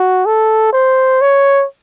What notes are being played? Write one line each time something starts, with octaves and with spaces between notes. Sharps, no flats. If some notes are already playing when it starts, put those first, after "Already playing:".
Already playing: F#4
A4
C5
C#5